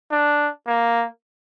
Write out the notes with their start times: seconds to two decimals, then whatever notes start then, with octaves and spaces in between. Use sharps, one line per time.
0.11 D4
0.67 A#3